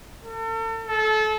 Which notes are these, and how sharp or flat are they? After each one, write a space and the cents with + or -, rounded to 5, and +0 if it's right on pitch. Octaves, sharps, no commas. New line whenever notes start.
A4 +40
A4 -30